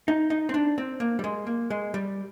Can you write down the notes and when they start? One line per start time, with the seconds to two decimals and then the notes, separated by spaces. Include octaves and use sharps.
0.08 D#4
0.30 D#4
0.49 C4
0.54 D4
0.78 C4
1.00 A#3
1.19 G3
1.24 G#3
1.47 A#3
1.70 G#3
1.94 G3